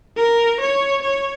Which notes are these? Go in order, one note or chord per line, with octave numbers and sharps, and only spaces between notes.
A#4
C#5
C#5